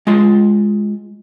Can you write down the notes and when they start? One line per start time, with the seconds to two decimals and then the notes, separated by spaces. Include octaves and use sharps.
0.07 G#3 F4 C6